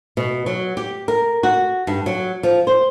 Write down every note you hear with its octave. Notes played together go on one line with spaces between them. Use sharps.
B2
F#3
G4
A#4
F#4
G2
F#3
F3
C5